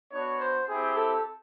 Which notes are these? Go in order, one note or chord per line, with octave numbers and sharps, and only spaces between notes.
B3 D4 F#4 C#5
C5
C4 E4 G4 G#4
A4